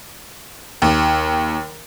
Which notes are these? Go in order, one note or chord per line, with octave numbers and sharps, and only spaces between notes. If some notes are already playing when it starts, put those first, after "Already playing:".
D#2